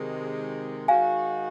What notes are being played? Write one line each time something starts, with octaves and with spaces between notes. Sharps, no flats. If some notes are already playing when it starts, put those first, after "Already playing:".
Already playing: C3 D#3 G#3
D#3 G#3 D#4 F#4 F5 G#5